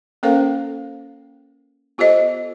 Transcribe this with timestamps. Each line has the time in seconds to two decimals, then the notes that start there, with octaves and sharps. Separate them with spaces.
0.23 A#3 C#4 A4 A#4 C5 F5
1.98 B3 F4 G4 A4 C5 D#5